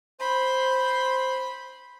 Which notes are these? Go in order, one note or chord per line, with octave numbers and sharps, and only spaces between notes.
C5 B5 C6